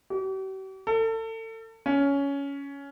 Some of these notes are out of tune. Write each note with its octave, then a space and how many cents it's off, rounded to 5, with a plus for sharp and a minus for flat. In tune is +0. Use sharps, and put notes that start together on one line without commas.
G4 -45
A4 +35
C#4 +15